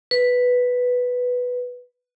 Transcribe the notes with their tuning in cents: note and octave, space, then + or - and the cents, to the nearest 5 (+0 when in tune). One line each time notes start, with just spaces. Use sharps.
B4 +0